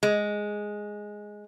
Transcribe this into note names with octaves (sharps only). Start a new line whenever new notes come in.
G#3